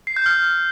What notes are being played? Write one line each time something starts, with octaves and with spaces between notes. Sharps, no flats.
C7
G6
F6